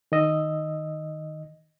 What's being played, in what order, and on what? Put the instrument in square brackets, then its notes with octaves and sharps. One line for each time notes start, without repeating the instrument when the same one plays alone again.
[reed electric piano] D#3 D#5 E6